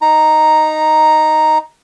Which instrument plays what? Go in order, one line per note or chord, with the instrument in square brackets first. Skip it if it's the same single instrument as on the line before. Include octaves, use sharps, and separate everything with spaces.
[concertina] D#4 A#5